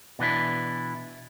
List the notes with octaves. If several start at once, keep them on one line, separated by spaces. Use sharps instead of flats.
B2 E3 D4 E4